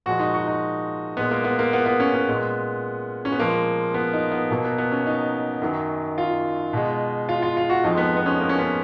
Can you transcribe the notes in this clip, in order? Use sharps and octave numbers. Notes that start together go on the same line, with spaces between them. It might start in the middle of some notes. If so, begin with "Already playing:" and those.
A#2 F3 G#3 F#4
D#4
F#4
D#4
A#2 G#3 B3
A#3
B3
A#3
B3
B3
C#4
B3
A#2 G#3
C#4
B3
A#2 F3 G#3 A#3
B3
D#4
B3
B2 F#3 A#3
B3
B3
C#4
D#4
F#2 D#3 F#3
F4
B2 G#3
F4
F4
F4
F#4
F2 F3 G#3 D#4
B3
B3
C#4
A#3
C#4
B3